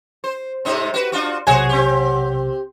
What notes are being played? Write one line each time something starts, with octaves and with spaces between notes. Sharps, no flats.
C5
G#2 C3 D#4
F#4 B4
D4 F4 F#4
B1 C3 F#4 G#4 C5 C#5 F#5 G#5
C4 G4